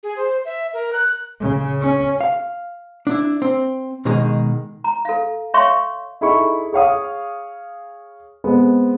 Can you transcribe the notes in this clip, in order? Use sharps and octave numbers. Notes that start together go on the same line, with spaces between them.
G#4
C5
E5
A#4
F#6
C#3
C#4
F5
D4 E4
C4
B2 D#3 G#3 D#4 G#4
A#5
A4 F5
C#5 E5 F5 G5 C6 C#6
D#4 E4 G#4 A4 C#6
G#4 C#5 F5 D#6
G#3 B3 C4